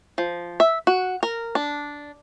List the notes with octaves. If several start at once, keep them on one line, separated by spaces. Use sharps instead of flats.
F3
E5
F#4
A#4
D4